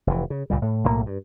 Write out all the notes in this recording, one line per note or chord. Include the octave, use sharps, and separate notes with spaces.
F1 E3
C#3
C#2 A#2 G3
A2
B1 A2 D#3 A#3
G2